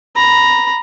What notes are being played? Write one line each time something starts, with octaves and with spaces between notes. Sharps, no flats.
A#5 B5